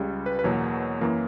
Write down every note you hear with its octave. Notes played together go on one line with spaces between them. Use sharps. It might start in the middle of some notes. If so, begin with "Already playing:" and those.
Already playing: C#2 C#3 G3
B4
B4
E2 B2 F#3 A#3 C#5
F#2 E3 A#3